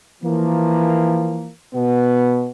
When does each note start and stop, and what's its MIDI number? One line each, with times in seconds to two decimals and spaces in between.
0.22 1.50 52
0.22 1.50 53
0.22 1.50 58
1.73 2.49 47
1.73 2.49 59